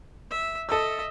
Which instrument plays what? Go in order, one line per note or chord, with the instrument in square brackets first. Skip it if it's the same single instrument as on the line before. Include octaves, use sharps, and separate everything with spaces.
[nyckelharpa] E5
[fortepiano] A4 E6 [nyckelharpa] D#5 E5